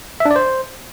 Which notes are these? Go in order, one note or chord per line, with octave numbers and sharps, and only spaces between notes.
E5
D4
D5
C5